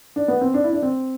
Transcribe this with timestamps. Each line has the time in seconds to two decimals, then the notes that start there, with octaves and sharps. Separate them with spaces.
0.16 D4
0.28 B3
0.41 C4
0.54 D4
0.64 E4
0.73 D4
0.83 C4